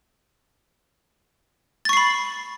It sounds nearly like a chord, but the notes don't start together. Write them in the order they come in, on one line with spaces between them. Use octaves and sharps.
A6 C#6 C7 B5